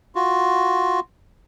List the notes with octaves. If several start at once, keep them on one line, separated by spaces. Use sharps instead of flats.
F4 F#4